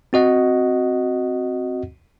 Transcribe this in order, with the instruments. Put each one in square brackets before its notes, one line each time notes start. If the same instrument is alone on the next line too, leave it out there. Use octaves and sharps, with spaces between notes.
[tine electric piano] C4 F#4 D#5 F#5